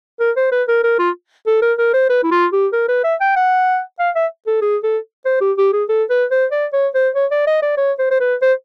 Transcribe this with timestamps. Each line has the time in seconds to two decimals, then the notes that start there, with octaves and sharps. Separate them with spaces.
0.20 A#4
0.36 C5
0.52 B4
0.68 A#4
0.84 A#4
0.99 F4
1.47 A4
1.62 A#4
1.78 A#4
1.94 C5
2.09 B4
2.24 E4
2.31 F4
2.52 G4
2.73 A#4
2.88 B4
3.04 E5
3.20 G5
3.36 F#5
3.99 F5
4.15 E5
4.47 A4
4.62 G#4
4.83 A4
5.25 C5
5.41 G4
5.58 G4
5.73 G#4
5.89 A4
6.10 B4
6.31 C5
6.51 D5
6.73 C#5
6.94 C5
7.15 C#5
7.31 D5
7.47 D#5
7.62 D5
7.77 C#5
7.99 C5
8.11 C5
8.20 B4
8.42 C5